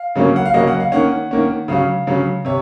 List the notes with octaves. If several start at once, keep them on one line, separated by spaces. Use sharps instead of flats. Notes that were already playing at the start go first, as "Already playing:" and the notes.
Already playing: F5
C#3 F#3 A#3 C#4
F#5
F5
C#3 F#3 A#3 C#4 D#5
F#5
F5
D#3 A#3 C#4 F#5
D#3 A#3 C#4
C#3 F#3 C#4 F5
C#3 F#3 C#4
C3 C#5